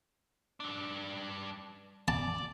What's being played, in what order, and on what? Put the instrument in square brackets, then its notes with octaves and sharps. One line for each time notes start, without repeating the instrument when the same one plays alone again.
[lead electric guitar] G2 D4
[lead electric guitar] D5 [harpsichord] A5